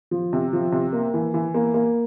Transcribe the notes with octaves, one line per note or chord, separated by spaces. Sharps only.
F3
C3
F3
C3
A#3
E3
E3
A#3
A#3